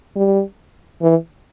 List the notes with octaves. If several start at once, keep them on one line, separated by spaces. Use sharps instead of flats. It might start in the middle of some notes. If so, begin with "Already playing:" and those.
G3
E3